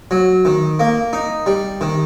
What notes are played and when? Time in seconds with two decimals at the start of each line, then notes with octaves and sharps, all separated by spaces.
0.11 F#3
0.45 D#3
0.80 A#3
1.13 D#4
1.46 G3
1.81 D#3